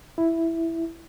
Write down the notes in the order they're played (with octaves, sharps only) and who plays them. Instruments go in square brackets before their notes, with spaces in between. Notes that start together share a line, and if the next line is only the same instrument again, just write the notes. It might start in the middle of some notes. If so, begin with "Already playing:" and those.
[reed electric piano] E4